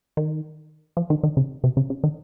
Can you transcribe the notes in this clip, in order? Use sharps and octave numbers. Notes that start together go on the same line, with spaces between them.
D#3
F3
D#3
D#3
C#3
C3
C#3
C#3
D#3